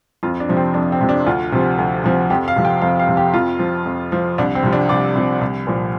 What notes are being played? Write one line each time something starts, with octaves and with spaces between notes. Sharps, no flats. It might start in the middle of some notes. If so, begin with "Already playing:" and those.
F2 F4
D4
C3 F3
C4
F2 D4
C4
C3 F3
D4
D2 F4
C3 F3
D2
C3 F3
F2 G4
F5
C3 F3
G5
F2 F5
F5
C3 F3
G4
F2 F4
F3
F2
F3
C2 D4
C4
C3 F3
D4
C2 D5
C3 F3
C2
A#2 F3